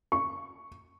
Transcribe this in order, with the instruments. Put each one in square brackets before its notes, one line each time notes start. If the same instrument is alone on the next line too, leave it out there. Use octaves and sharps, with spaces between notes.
[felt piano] C#6